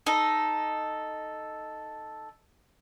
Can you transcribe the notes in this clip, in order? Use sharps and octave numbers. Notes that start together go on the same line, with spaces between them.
D#4 A4